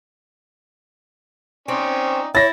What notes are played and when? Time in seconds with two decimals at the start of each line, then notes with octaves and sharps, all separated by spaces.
1.68 C4 C#4 D#4 D5
2.35 E4 C#5 A6 A#6